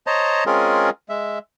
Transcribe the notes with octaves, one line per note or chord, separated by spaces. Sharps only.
C5 C#5 D#5 A5 A#5
G#3 C4 C#4 F4 G#4 A#4
G#3 E5